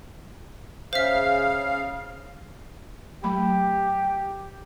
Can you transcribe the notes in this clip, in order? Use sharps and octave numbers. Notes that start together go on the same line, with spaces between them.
C#3 C5 E5 F5
F#3 A3 G4 B5